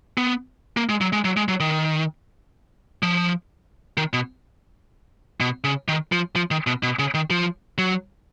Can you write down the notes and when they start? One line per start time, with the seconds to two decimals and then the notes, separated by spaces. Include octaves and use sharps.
0.18 B3
0.77 A#3
0.89 G#3
1.01 F#3
1.13 G#3
1.25 F#3
1.37 G#3
1.48 F#3
1.60 D#3
3.03 F3
3.97 D#3
4.13 B2
5.40 B2
5.64 C#3
5.88 D#3
6.12 F3
6.36 F3
6.51 D#3
6.67 B2
6.83 B2
6.99 C#3
7.14 D#3
7.30 F3
7.78 F#3